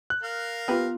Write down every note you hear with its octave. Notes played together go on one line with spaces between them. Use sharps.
F#6
A#4 F5
B3 F4 G4 B4